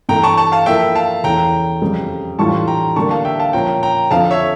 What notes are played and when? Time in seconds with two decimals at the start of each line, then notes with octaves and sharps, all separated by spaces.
0.09 G2 E3 A3 G5 A#5
0.23 A5 C#6
0.37 A5 C#6
0.52 F5 A5
0.66 F3 A#3 E4 A4 E5 G5
0.95 F5 A5
1.23 E2 E3 A3 C#4 G5 A#5
1.82 F2 C#3 G3
2.39 A2 E3 G3 D4 F4 A5 C#6
2.68 G5 A#5
2.96 D3 G3 A#3 D4 A5 C#6
3.11 F5 A5
3.25 E5 G5
3.39 F5 A5
3.53 A#2 F3 C#4 G5 A#5
3.83 G5 A#5
4.11 F2 D3 F3 F5 A5
4.30 C#5 E5